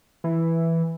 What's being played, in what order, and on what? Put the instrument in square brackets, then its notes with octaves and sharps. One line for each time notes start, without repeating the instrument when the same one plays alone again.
[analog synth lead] E3